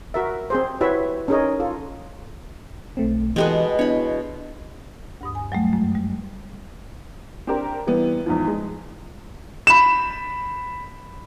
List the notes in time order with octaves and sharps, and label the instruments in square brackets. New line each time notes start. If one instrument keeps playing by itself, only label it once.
[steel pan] F#4 A#4 E5
C4 G#4 C5
E4 F#4 G4 B4 C#5 E5
C#4 D#4 G#4 A#4 C#5 D#5
F4 A4
[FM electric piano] B1 A3 C4
[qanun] B2 G#3 B3 [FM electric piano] E3 G4 A4
[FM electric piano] B3 D4 E4 [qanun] C#5 B5
[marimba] D2 G2 D#6
G#5
F#3 G3 A3
F#2 G#3
G3
[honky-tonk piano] C4 D4 G4 A#4
E3 G3 B3
E2 G#2 F3
G#3
[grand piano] B5 E7